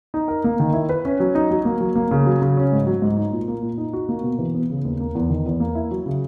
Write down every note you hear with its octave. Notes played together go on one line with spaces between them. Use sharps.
D#4
A#4
A#3
D#3
E4
B4
C#4
F#3
D#4
F#3
A#3
F#3
A#3
C#3
F#3
C#3
C#4
G#2
F#3
G#2
D#4
A#2
A#3
A#2
D#4
F#4
A#3
B2
E3
B3
C#3
D#2
A#3
E2
D#3
E2
A#3
E4
F#3
C#3